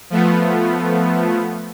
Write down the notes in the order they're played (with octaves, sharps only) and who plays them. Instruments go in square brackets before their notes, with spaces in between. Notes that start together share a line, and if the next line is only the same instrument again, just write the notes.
[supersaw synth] F3 A3 B3